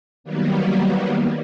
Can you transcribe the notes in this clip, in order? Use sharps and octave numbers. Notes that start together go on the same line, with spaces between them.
D#3 F#3 G3 A#3 B3